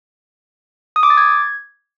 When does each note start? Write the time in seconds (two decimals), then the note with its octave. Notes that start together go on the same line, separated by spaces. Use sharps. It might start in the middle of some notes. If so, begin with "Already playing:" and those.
0.96 D#6
1.03 D6
1.10 A6
1.17 G#6